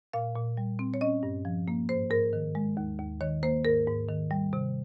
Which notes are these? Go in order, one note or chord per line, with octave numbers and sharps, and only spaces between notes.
A#2 F5
A#2
G3
C4
C#5
C#4 D#5
G2
F3
A#3
G#2 C5
G#2 A#4
D#3
G#3
D#2
D#2
D#3 C#5
A#3 C5
G#2 A#4
G#2
D#3
G3
C3